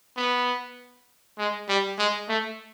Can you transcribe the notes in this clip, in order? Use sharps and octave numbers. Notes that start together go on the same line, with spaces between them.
B3
G#3
G3
G#3
A3